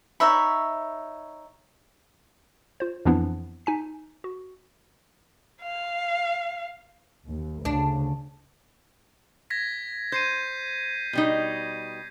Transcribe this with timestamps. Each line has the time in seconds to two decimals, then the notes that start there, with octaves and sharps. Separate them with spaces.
0.20 D#4 C#5 E5 B5
2.80 F4 C5
3.05 F2 E3 F3 B3 D4 E4
3.66 D#4 G#5 B6
4.24 F#4
5.62 F5
7.28 D#2
7.65 D2 C#3 D4
9.50 G#6 A#6 B6
10.12 C5 G6 C7 D#7
11.13 B2 G3 D#4